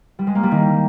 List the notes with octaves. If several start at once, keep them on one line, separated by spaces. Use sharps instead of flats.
G3
G#3
A#3
G3
D#3